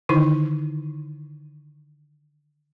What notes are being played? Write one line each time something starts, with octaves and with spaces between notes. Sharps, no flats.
D3 D#3 D#4 E4